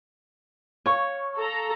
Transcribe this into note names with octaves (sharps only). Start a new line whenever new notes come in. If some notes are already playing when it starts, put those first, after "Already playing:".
C#5 F5 C#6
A4 A#5